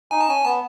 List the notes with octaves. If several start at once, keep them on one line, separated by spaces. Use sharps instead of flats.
D#4 G#5
A5
C#4 G#5
B3 A5